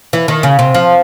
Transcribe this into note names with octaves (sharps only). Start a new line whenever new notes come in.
E3
D#3
C#3
C3
F3